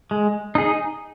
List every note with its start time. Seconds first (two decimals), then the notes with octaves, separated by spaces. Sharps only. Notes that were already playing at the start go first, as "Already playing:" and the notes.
0.11 G#3
0.55 D#4 G#4